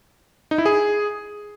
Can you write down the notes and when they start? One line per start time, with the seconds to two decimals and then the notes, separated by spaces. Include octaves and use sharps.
0.51 D#4
0.58 E4
0.66 G#4